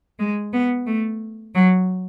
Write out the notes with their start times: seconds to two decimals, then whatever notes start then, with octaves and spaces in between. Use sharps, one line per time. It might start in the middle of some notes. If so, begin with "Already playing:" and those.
0.19 G#3
0.52 B3
0.86 A3
1.54 F#3